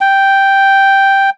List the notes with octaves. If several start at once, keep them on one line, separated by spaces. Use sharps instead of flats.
G5